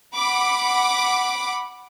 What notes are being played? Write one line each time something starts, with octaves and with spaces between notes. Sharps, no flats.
F#5 B5 D6